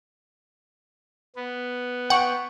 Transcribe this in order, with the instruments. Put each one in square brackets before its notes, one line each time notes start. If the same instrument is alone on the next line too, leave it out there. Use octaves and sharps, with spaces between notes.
[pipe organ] B3
[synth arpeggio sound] F#5 [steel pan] G5 C#6